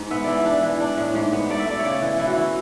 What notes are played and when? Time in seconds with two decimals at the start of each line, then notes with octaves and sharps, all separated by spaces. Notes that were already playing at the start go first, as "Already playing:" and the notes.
Already playing: G#2
0.11 B3 E5
0.24 E3 D5
0.39 E5
0.45 D4
0.63 E3
0.80 D4
0.97 A2
1.15 G#2
1.33 B3
1.50 A3 D5
1.59 E5
1.67 A3 D5
1.79 C#5
1.84 C#3 D5
2.02 E3
2.19 E3 E4
2.27 F#4
2.35 E3 E4